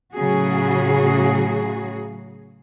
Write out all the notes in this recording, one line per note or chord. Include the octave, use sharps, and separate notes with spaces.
A2 C#3 F#3 F#4 G#4